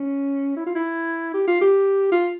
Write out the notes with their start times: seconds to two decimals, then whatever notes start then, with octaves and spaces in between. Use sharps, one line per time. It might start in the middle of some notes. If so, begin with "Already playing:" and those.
Already playing: C#4
0.57 E4
0.66 F4
0.75 E4
1.34 G4
1.47 F4
1.61 G4
2.12 F4